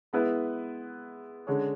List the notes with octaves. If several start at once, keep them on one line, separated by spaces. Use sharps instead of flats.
G#3 B3 E4 B4
D3 G#3 C#4